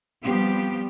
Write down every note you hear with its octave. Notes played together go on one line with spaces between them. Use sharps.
F3 G3 B3 C4 G4